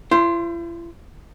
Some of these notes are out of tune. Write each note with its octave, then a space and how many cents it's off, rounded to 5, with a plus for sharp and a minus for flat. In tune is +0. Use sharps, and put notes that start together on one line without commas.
E4 +45 C5 +0